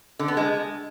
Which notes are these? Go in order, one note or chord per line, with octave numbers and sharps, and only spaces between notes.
D3
B3
G#3